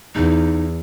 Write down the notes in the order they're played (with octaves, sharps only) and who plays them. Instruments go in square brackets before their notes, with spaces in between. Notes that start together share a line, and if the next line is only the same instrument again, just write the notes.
[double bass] E2 [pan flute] D#4